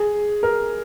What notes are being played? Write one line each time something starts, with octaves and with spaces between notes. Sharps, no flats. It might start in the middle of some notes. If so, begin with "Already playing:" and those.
Already playing: G#4
A#4